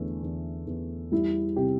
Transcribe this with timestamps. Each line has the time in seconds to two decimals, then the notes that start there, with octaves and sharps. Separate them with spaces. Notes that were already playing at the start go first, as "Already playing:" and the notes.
Already playing: E2 D3 A3
0.23 E2
0.67 E2
1.12 G3 E4
1.56 C3 G4